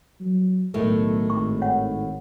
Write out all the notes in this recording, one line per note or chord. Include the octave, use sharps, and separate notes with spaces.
F#3
B1 A2 D#3 A3
G#1 C#6
C#5 F#5